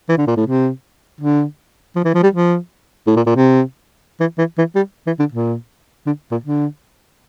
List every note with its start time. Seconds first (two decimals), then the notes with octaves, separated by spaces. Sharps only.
0.09 E3
0.18 D3
0.27 A#2
0.37 A2
0.46 C3
1.21 D3
1.96 F3
2.04 E3
2.14 F3
2.23 G3
2.33 F3
3.07 A2
3.16 A#2
3.26 A#2
3.36 C3
4.20 E3
4.38 E3
4.58 E3
4.75 G3
5.07 E3
5.19 D3
5.32 A#2
6.06 D3
6.31 A#2
6.44 D3